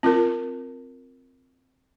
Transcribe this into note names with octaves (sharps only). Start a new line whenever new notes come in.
C4 F4 A#4